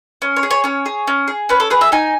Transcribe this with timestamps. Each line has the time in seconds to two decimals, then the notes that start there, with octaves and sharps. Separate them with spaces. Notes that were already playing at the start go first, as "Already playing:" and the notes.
0.22 C#4
0.36 C#5
0.43 G#4
0.51 C#5
0.64 C#4 C#5
0.86 G#4
1.07 C#4
1.28 G#4
1.49 C#4 B4
1.60 A4
1.70 G#4 B4
1.81 E5
1.92 D#4 G#5